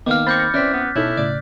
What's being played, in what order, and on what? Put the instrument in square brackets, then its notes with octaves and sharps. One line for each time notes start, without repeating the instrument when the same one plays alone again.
[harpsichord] D#3 A#3 F5 [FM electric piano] B3 [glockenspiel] D6 F6
[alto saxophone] C4 [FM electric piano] B5 A#6 C#7 [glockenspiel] D6 G6 A6
[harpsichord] E3 C4 [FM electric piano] C#4 [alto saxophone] D5 [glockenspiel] F#6 B6
[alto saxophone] B3
[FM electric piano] B2 D#4 A4 [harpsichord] C#4 [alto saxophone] E4
[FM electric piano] A2 C#3 [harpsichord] D5